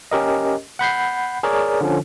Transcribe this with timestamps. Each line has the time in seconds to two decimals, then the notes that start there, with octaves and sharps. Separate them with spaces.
0.11 C#4 G4 A#4 D#5
0.79 F#5 B5 G6 C7
1.43 G#4 A#4 C#5 D5
1.81 D3 F3 C#4